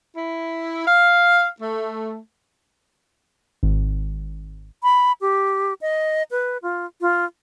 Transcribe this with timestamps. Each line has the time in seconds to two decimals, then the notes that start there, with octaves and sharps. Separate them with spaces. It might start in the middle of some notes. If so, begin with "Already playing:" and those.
0.16 E4
0.86 F5
1.60 A3
3.63 G#1
4.83 B5
5.21 G4
5.81 D#5
6.31 B4
6.63 F4
7.01 F4